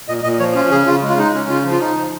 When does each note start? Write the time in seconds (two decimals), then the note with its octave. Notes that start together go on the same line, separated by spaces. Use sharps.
0.08 A#2 D#5
0.23 A#2 D#5
0.39 F3 C#5
0.55 C#4 F4
0.71 C#3 G#4
0.86 C#3 F4
1.02 G#3
1.09 F4
1.17 G#3 D#4
1.34 C#4
1.49 C#3 F4
1.65 F3
1.71 F4
1.80 D#4
1.97 F3